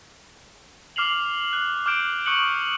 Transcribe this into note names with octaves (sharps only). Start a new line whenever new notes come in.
D6 F6 C7 F7 F#7
F#6
D6 F6 G6 D7 E7
C#6 D#6 F#6 C#7 F#7